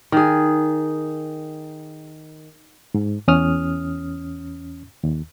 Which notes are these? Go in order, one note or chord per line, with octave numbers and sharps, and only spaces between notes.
D#3 G#4
G#2
E2 C#4 D#6 F6
D#2